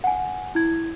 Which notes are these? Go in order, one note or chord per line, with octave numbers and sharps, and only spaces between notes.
F#5 G#5
E4 G#6